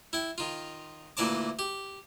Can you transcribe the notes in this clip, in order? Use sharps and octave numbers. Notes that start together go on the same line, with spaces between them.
E4 G5
D#3 F4
D2 A#2 E3 D5 A5 D6
G4